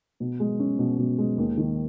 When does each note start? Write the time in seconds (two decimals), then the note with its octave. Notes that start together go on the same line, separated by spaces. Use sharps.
0.20 B2
0.40 G#3
0.59 C#4
0.79 B2
0.98 B2
1.18 G#3
1.38 D#2
1.57 D#3